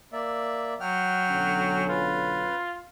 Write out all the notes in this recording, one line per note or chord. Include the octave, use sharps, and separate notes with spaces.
A#3 D5 E5
F#3 F#5 G5 F6
B1 D3 C#4
F4 B4